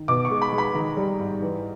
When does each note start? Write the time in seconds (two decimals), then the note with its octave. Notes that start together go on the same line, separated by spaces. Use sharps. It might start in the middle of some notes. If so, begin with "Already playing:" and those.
Already playing: D#3
0.08 B2 D6
0.25 C#6
0.30 G#3
0.42 B5
0.52 G#3
0.58 B5
0.74 D#3 A#5
0.97 G3
1.19 G#2
1.41 E3